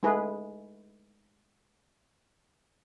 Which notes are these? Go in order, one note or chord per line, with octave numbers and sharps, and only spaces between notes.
G#3 A3 E4 G#4 B4